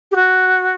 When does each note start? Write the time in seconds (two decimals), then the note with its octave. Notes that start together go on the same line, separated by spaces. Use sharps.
0.11 G4
0.15 F#4